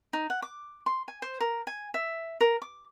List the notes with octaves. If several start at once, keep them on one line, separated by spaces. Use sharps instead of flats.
D#4
F#5
D6
C6
G#5
C5
A#4
G#5
E5
A#4
D6